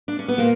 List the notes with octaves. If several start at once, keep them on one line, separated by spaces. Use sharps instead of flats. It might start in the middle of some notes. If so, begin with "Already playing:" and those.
D4
C#4
B3
A#2 A#3